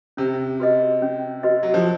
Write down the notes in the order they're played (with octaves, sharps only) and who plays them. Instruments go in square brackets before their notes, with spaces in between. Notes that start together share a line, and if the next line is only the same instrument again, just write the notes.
[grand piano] C3 [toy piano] C#4
[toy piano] F#4 B4 D#5
C#4
F#4 B4 D#5
[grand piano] F#3
F3